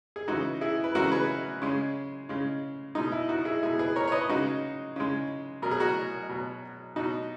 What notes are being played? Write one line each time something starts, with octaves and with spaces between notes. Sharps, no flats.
G#4
C#3 E3 G#3 D#4 F#4
E4 G#4
B4
C#3 E3 G#3 F#4 A#4
G#4 B4
C#3 G#3
C#3 G#3
B2 G#3 D#4
E4
D#4 F#4
E4 G#4
B2 G#3 E4 G#4
G#4 B4
A#4 C#5
C#5
B4 D#5
C#3 G#3 D#4 F#4
C#3 G#3
B2 F#3 A#4
G#4
F#4 A#4
B2 F#3
B2 F#3 D#4 F#4